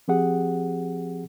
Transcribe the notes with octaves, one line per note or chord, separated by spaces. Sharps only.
F3 C4 G4 G#4 F#5